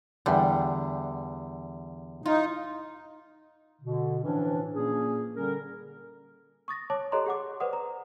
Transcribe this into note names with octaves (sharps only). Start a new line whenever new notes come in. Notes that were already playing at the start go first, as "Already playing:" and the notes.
E2 D3 G3
D#4 F4
B2 D3
A2 E3 F3 C#4 D4
A#2 A#3 C#4 G#4
D3 G3 C#4 A#4
C#6 D#6 A6 A#6
C#5 A5 D6
G4 A4 C#5 D#5 A#5 C6
G#4 F#5 D6
B4 C5 D5 F#5 D#6
A#5